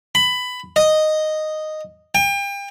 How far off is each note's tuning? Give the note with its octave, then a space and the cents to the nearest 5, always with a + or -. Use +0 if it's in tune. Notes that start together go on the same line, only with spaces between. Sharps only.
B5 +15
D#5 -5
G5 +35